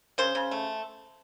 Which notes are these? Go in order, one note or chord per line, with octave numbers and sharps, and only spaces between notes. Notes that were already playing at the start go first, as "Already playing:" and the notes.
C#3 C5
C#3
A3